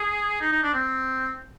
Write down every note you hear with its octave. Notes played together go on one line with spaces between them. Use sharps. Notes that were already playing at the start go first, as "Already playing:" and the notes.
Already playing: G#4
D#4
D#4
D4
C4